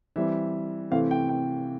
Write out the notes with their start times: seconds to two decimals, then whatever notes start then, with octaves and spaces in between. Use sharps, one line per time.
0.16 E3 G3 C4 E5
0.91 C3 E3 A3 C4 F5
1.11 G5
1.29 G5